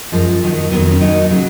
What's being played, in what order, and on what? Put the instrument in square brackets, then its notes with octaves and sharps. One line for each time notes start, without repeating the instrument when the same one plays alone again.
[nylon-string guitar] F#2 F3 G#3
D#2 D#3 F#3
F2 D#3 F#3 B3
B3
C#4
D#2 D#3 F#3 D#4
C#3 F#3